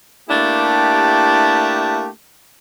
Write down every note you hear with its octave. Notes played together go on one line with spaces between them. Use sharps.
A3 A#3 D4 E4 G4